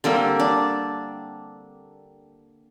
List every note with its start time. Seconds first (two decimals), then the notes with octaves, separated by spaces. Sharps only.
0.04 D3 G3 A#3 C4
0.40 D4